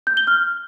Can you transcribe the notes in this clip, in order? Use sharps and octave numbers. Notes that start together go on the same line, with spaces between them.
G6
G7
F6